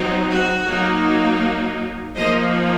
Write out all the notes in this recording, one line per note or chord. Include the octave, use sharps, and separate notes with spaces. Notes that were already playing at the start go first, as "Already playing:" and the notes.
Already playing: F#3 C4 D#4
F#4
F#3 A#3 D#4
F3 A#3 D#4 C5 D#5